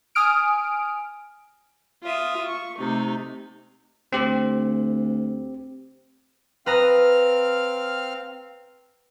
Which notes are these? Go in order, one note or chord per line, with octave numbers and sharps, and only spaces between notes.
G#5 D#6 F6 D7
F4 E5 D#6
C#6
C3 A3 D#4
D2 C4 G4
C4 B4 F5 A#5 D#6 F6